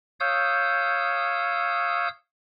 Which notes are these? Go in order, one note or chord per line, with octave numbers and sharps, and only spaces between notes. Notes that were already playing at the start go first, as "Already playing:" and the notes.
C#5 F5 D#6 E6 G6